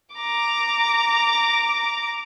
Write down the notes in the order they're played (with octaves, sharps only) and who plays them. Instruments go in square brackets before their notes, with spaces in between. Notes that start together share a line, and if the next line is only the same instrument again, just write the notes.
[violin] A#5 D6